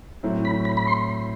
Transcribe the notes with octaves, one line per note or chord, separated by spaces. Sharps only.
A2 F#3 A3 C4 E4
B5
B5
B5
C6